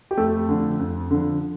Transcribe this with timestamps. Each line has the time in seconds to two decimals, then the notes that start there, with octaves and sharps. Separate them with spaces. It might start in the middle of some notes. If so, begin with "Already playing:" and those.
0.11 G4
0.17 F2 A3 A4
0.49 D3 F3
0.79 F2
1.11 D3 F3